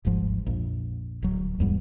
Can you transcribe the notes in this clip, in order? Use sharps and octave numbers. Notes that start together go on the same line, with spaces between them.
D#1 G#1 G#2 F3
A#1 F2
D1 F#3
D1 E2 G#2 G3